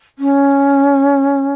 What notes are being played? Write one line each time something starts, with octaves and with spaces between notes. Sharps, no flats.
C#4